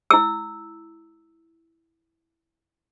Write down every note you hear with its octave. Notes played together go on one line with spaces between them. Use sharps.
E4 E6